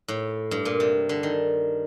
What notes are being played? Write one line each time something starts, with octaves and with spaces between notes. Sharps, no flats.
A2
G2
A#2
C3
D3
D#3